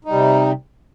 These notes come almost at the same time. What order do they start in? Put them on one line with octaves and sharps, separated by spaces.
D#4 G3 C3